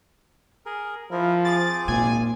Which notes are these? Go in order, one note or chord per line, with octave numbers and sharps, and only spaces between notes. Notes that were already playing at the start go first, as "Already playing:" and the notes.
G#4 A#4
F3 E4 A#4
C4 G#4 D6 A6
G#1 A#2 G#5